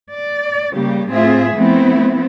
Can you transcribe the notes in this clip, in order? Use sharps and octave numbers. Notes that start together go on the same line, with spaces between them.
D5
C#3 G3 A#3 G4
A2 C4 F4 G#4 E5
F3 A3 B3 C4 E4